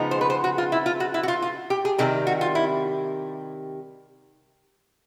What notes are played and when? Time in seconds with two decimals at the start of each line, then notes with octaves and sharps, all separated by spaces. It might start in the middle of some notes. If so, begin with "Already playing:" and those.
Already playing: C#3 F3 G#3 B3 D#4
0.11 C5
0.21 B4
0.30 C5
0.44 F#4
0.58 F4
0.72 E4
0.86 F4
1.00 F#4
1.14 E4
1.23 F#4
1.28 F4
1.42 F4
1.70 G4
1.85 G#4
1.98 C3 D#3 G3 G#4
2.27 F#4
2.41 F4
2.55 E4